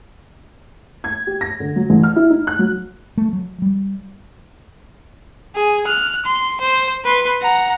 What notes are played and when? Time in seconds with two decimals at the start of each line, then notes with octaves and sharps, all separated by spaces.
1.04 G#6
1.27 G4
1.41 A#6
1.60 D3
1.76 F#3
1.90 A1
2.03 F6
2.16 E4
2.30 D#4
2.47 F#6
2.59 F#3
3.18 A3
3.33 F#3
3.62 G3
5.55 G#4
5.86 F6 F#6
6.26 C6
6.61 C5
7.05 B4 C6
7.42 F#5 A#5